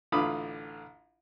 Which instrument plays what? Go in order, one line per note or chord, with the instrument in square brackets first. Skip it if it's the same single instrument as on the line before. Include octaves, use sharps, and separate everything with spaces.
[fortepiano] A1 D3 F4 B5 D6 D#6